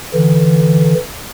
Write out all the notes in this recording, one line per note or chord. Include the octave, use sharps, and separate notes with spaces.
D3 E3